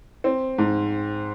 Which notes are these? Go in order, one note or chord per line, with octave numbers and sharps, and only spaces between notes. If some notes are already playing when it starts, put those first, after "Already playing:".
C4
G#2